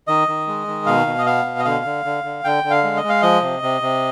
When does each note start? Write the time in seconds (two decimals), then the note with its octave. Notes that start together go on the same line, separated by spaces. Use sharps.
0.08 D#3 D#5
0.28 D#3
0.47 G#3
0.67 D#3
0.86 B2 F5
1.07 B2
1.18 D#5
1.26 B3 F5
1.45 B2
1.59 D#5
1.65 D3 F5
1.85 D3
2.05 D3
2.24 D3
2.44 D3 G5
2.64 D3
2.70 F5
2.84 G#3
2.97 D#5
3.03 G#3
3.09 F5
3.22 F3 D#5
3.42 C3
3.63 C3
3.81 C3